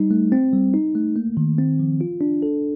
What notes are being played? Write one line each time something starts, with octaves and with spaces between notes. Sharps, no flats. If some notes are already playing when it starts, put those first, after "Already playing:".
Already playing: G3 D#4
A3
C4
G3
D#4
A3
A#3
D#3
C4
F3
F4
D4
A4